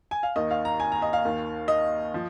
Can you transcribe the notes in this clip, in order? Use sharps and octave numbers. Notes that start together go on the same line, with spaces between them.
G#5
F5
D#2 D#3 D#5
F5
A#5
G#5
A#5
D#5
F5
D#2 D#3
D#5
F3